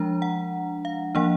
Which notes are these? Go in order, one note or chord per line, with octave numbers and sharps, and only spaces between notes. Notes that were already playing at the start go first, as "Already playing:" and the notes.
Already playing: F3 G#3 D4 A#5
F#5
F5
F3 A#3 D4 F#5